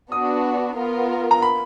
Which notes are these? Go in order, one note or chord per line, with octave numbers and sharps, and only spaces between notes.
B3 D4 F#4 D#6
B3 F4 A#4
A#5
B5